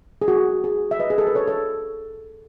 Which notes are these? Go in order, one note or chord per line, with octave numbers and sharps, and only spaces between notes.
G#4
F#4
G#4
E5
B4 D#5
G#4
A4
B4
A4 C#5
A4